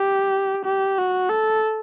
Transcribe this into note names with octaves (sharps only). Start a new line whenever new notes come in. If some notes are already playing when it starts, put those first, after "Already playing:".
Already playing: G4
G4
F#4
A4